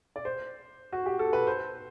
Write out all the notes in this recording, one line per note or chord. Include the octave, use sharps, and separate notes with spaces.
D5
C5
F#4
G4
A4
B4
C5